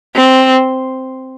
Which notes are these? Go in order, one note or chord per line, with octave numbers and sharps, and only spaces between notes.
C4